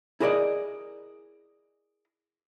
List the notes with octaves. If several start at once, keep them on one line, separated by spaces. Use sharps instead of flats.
E4 G#4 A#4 C5 D5 D#5